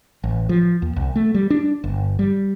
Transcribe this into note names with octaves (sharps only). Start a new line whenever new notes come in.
A1
F3
D#2
C2
A3
G3
D4
G1
G3